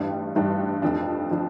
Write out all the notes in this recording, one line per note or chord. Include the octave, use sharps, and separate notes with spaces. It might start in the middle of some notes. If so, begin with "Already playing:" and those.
Already playing: A1 G2 G3 D4
A1 G2 G3 D4
F1 F2 F3 D4
F3 D4